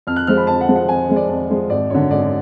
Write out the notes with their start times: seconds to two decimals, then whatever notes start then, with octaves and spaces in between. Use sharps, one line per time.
0.07 F2 F6
0.16 F#6
0.27 F3 G#3 F6
0.37 B5
0.47 F2 A5
0.61 F#5
0.69 F3 G#3
0.75 F#5
0.88 F2 G#5
1.09 F3 G#3
1.16 D5
1.29 F2 D5
1.50 F3 G#3
1.70 G#1 D5
1.90 F#2 D3 C#5
2.11 G#1 D5